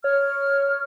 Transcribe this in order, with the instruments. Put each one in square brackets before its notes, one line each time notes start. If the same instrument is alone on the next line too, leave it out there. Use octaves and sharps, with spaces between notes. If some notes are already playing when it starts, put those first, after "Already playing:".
[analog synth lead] C#5 [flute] F6